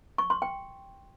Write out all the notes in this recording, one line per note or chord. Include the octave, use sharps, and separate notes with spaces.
C#6
C6
G5